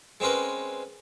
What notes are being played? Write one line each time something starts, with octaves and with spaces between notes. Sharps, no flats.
G#3 C4 C#4 A#4 B4